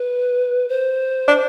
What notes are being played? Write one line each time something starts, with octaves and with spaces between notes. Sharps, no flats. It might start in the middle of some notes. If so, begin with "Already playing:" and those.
Already playing: B4
C5
D4